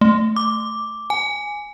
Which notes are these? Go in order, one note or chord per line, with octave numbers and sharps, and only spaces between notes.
A3
D6
G#5